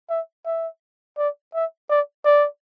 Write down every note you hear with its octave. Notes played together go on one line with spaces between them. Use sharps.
E5
E5
D5
E5
D5
D5